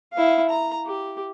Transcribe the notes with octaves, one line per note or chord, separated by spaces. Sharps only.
E4 F5
A#5
G4